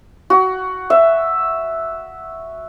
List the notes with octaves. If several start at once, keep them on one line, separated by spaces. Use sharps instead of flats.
F#4
E5